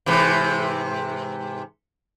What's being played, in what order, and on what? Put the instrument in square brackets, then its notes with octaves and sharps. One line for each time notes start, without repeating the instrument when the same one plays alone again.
[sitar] G#2 C3 E3